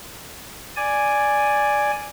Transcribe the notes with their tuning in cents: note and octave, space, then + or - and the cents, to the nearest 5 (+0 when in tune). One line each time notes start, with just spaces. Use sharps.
D5 +0 G#5 +0